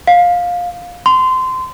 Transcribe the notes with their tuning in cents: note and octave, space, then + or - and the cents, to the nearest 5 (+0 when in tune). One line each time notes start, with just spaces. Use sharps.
F5 +15
C6 -25